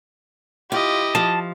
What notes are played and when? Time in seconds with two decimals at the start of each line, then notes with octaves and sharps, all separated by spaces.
0.72 E4 F4 G4 D#5
1.15 F3 A5